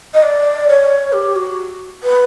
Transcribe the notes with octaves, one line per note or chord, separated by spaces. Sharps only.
D#5
D5
C#5
G4
F#4
B4